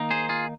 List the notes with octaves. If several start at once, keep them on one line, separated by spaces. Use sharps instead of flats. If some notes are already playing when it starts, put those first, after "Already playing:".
Already playing: D#3 A#3 D#4
G#4 C5
F4 G#4